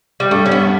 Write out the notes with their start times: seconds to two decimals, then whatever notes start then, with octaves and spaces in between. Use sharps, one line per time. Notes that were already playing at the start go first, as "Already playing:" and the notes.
0.20 G3
0.31 G2 A3
0.46 C#4
0.52 B3